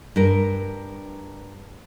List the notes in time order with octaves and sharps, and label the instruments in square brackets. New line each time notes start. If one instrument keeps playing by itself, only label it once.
[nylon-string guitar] G2 A#4